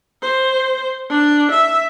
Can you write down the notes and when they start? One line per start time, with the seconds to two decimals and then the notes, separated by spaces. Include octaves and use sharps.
0.22 C5
1.10 D4
1.51 E5